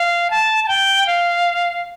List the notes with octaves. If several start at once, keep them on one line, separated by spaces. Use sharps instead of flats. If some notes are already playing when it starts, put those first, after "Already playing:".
Already playing: F5
A5
A5
G5
F5